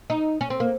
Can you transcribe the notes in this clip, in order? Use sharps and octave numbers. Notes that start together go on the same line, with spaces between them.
D#4
C#4
C4
A#3